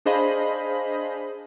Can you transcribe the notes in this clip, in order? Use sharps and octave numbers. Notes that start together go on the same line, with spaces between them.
D4 G#4 C5 D#5 F5 B5